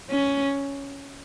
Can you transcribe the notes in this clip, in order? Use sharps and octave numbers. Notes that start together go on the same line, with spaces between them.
C#4